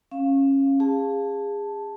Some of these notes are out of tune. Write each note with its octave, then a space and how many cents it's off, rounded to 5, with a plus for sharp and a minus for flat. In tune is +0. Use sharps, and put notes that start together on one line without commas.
C#4 -20 F5 +0
G#4 -25 A5 +0